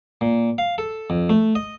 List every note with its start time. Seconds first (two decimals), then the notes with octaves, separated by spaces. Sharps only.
0.21 A#2
0.58 F5
0.78 A4
1.10 F2
1.30 A3
1.55 D#5